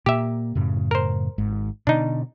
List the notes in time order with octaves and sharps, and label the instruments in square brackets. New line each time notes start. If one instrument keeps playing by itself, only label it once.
[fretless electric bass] A#2 A#3 [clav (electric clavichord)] G4 E5
[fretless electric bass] F#2 A2 C#3
[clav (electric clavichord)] A#4 C5
[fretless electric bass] G#1 G#2
[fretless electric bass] B2 D3 [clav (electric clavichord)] D4 D#4